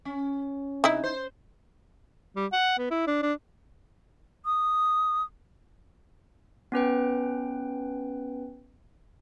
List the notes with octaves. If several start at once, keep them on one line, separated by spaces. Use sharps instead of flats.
C#4
C3 D#4 E4
C5
G3
F#5
B3
E4
D4
D4
D#6
B3 C#4 B4 G5